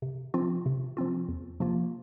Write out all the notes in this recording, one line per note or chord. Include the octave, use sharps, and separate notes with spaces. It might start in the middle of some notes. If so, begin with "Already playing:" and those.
C3
F3 C4 F4
C3
F3 C4 F4
E2
C3 F3 A#3 F4